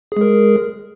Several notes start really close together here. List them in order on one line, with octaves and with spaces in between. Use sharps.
G#4 G#3 A#4